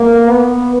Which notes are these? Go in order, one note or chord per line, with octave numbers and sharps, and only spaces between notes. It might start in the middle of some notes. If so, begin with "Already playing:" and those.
Already playing: A#3
B3